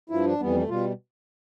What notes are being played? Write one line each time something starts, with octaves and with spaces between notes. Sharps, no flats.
G2 F3 E4
D4
F2 E3 G3 B3
A3
B2 G3 F4